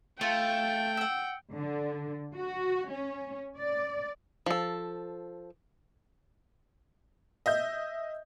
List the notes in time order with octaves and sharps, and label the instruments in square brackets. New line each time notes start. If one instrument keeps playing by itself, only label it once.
[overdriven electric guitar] A3 [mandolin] F4 [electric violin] G5
[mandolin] F#5 E6
[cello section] D3
F#4
C#4
D5
[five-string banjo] F3 A4
[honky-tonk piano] D#5 E5 G6